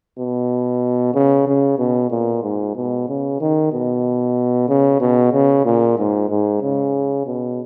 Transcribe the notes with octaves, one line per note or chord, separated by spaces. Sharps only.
B2
C#3
C#3
B2
A#2
G#2
B2
C#3
D#3
B2
C#3
B2
C#3
A#2
G#2
G#2
C#3
B2